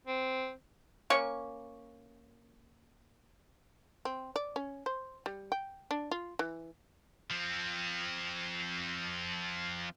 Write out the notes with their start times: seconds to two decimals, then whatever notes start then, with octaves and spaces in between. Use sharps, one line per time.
0.07 C4
1.10 A#3 C#4 C#6
4.05 C4
4.36 D5
4.56 C#4
4.86 C5
5.26 G3
5.52 G5
5.91 D4
6.11 F4
6.39 E3
7.31 F3 C4